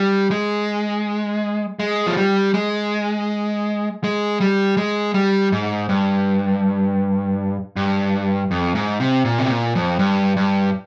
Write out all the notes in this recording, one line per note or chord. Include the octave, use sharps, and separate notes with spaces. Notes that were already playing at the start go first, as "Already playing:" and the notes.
Already playing: G3
G#3
G#3
F3
G3
G#3
G#3
G3
G#3
G3
G#2
G2
G2
F2
G#2
C3
A#2
C3
A#2
F2
G2
G2